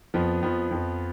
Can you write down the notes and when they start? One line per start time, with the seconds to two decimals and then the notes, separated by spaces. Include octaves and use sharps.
0.14 F2 F3 B3
0.42 F2 F3 B3
0.71 F2 F3